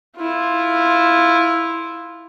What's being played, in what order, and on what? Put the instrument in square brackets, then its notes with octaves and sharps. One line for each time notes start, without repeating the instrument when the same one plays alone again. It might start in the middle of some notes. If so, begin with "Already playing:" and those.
[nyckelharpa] E4 F4